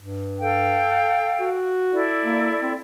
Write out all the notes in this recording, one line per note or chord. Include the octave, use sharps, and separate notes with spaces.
G2
A4 F5 G5
F#4
E4 A4 D5
A#3
C4